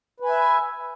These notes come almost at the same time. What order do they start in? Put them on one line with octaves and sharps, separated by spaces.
B4 G#5 E5